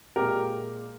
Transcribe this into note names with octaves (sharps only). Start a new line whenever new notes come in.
A#2 G#3 G4 A#4